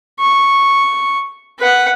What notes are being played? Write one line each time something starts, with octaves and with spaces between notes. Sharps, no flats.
C#6
B4 F#5